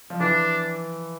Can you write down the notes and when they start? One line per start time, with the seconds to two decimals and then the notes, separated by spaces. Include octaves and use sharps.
0.10 F3
0.20 E3 D4